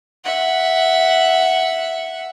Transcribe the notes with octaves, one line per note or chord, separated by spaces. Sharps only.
E5 F#5